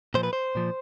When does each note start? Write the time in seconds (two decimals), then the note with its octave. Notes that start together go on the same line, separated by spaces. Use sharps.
0.14 A#2 F3 C5
0.23 B4
0.33 C5
0.55 A#2 F3